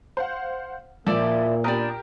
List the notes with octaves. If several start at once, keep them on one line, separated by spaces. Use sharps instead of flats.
C5 F5 F#5
A#2 F3 A#3 E4 D5
B3 D4 G4 A#4